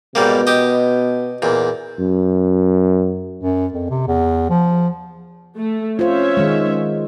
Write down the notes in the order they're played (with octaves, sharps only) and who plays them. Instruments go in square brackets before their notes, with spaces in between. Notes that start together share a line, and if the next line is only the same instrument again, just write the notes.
[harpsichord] G#2 G3 A#3 [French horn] B2
[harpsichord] G4 D#5
E2 A#2
[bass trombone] F#2
[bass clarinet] F#2
F2
C3
E2
F3
[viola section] A3
[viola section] C#4 C#5 E5 [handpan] F4 C5
[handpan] D#3 G#3